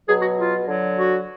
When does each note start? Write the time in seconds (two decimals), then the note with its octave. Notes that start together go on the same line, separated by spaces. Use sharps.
0.08 B2 F#3 G#4
0.22 F#4
0.36 F4
0.66 D3 F#3
0.96 F#4